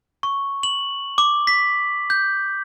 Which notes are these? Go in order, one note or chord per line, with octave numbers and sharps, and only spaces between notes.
C#6
F#7
D6
B6
G6